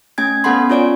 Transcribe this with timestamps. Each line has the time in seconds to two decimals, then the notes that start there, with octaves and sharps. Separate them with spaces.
0.18 A3 C#4 G#5 G#6
0.44 B3 C#4 A4 F#5 B5 C6
0.70 C#4 F4 C#5 D5 G#5 D7